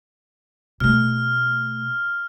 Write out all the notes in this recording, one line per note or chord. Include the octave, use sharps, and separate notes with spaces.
B2 A3 F6